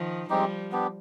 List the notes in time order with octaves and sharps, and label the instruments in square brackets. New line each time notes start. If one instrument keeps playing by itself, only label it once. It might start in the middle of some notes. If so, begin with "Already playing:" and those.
Already playing: [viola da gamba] D#3 F3
[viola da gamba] F3 G3 [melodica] G#3 C4 D#4 G4
[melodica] B3 D4 G4